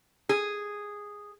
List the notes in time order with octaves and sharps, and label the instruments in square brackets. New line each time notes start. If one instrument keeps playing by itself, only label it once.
[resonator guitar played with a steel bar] G#4